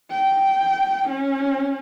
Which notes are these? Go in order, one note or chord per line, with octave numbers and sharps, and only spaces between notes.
G5
C#4